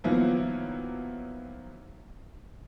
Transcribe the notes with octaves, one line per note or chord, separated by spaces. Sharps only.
D#3 F3 F#3 A#3 B3 E4